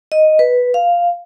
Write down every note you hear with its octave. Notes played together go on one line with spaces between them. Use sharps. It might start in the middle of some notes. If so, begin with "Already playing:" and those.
D#5
B4
F5